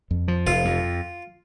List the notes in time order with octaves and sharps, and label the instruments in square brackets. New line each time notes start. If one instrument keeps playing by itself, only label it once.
[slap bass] F2
F3
[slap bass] F1 [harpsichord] F4
[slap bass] F2